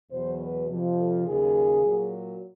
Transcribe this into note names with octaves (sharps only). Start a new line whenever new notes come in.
E2 B2 F#3 C5
B4
F2 C3 F3
A4
D#2 C#3 F#3 G#4
A#2 F#3